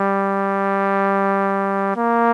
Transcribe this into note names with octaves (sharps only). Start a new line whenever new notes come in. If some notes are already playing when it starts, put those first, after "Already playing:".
Already playing: G3
A#3